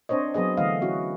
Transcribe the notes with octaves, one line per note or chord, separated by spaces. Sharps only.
C4 D4 C5 C#5 D#5
F#3 B3 G#4 D#5
D3 E3 A3 D#5 F5
C#4 E4 F#4